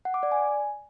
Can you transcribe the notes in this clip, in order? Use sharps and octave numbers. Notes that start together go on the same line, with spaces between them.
F#5
D6
D5
G#5